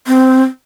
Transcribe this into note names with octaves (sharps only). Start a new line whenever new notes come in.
C4